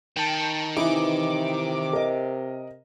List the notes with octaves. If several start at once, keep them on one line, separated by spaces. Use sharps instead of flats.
D#3 G5 A5
C3 E3 D#4 E4 D6
A#4 D#5